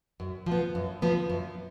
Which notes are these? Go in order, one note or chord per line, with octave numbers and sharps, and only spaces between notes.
F#2
F3
B3
F#2
F3 B3
F#2